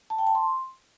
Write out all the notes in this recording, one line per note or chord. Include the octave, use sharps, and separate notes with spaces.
A5
G5
A5
C6